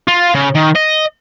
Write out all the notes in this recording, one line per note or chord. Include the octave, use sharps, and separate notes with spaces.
F4
C#3
D#3
D#5